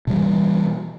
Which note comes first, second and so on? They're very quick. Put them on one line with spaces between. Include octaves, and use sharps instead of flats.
B2 G3 E3